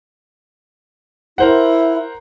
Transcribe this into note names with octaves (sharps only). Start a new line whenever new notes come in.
E4 A#4 C5 F#5